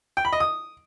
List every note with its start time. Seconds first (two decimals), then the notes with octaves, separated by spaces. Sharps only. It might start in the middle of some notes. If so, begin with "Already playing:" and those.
0.17 G5
0.25 B5
0.33 D#5
0.40 D#6